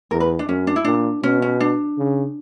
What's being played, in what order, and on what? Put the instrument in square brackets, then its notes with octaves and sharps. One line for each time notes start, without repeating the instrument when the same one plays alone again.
[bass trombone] E2 [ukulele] A#4
[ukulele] B4
D4
[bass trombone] F#2 [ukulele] C#4
[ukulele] D4
E4
[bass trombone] A#2 [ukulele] D4
[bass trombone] B2 [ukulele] C#4
[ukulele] C#4
D4
[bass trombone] C#3